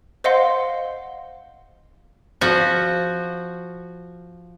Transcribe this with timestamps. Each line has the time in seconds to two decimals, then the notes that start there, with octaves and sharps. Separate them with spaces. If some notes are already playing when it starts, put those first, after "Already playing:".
0.24 C5 D#5 F5 F#5 C6
2.41 F3 F#4